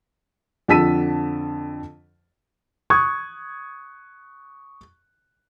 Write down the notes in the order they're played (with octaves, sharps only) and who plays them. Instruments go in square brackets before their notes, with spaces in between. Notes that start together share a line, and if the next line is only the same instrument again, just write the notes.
[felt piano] F2 D3 A5 E6 B6 D#7
[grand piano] C#6 D#6 F#6 G#6